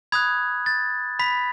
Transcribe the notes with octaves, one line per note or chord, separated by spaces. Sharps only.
B5 D#6 F#6 G#6
A6
B5 B6